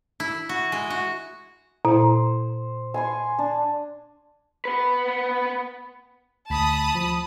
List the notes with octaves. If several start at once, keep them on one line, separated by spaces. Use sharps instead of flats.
E4
F#4
G#3
F#4
A#2 E4 C5
G#5 C6 C#6
D4
B3 B4
D2 A5 B5 D#6 B6
F3